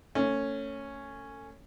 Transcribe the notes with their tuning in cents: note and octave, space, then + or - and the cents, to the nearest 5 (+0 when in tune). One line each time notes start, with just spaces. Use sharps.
A3 +30 C#4 +0